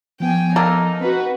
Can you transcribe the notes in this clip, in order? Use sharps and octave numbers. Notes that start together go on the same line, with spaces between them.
F3 B3 G5 G#5
A#3 D#4 A4 A#4
C4 F#4 B4